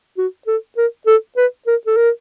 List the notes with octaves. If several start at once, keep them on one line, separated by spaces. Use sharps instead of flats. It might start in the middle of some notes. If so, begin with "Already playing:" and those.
F#4
A4
A#4
A4
B4
A#4
A4
A#4